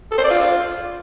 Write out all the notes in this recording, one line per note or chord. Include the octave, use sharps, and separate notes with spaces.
A4
C5
D5
F4